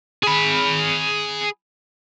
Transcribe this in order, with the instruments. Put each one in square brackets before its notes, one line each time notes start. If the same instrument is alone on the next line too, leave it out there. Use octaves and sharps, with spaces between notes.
[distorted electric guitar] G#4 B5